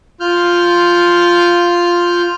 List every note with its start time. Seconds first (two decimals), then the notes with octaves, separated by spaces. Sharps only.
0.20 F4 F6 G6